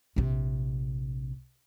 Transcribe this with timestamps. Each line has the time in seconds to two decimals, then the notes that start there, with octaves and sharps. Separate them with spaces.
0.16 A#1 C3